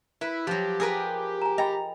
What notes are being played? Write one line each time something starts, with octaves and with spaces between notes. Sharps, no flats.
E4 B4
F3 F#3 G4
G#4 A#4 B4
G#5 A#5
D#5 G5 A#5 B5